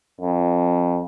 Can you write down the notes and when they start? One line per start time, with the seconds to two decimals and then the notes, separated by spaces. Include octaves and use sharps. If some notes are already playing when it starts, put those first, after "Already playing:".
0.21 F2